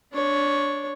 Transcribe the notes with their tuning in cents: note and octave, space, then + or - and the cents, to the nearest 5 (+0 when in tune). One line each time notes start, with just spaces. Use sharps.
D4 -10 C#5 +0